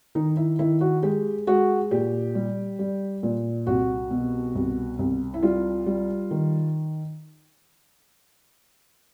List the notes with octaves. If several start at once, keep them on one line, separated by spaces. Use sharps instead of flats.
D#3 D#4
E4
D#3 E4
F#4
G#3 G4
G#3 F#4
A#2 G4
G3
G3
A#2
C2 F#4
B2
C2
C2
E4
G3 F4
G3
D#3